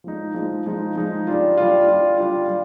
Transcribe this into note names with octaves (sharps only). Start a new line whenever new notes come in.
F3 G#3 D#4
F3 G#3 D#4
F3 G#3 D#4
F3 G#3 D#4
G3 D4 F4
G3 D4 F4
G3 D4 F4
G3 D4 F4
G3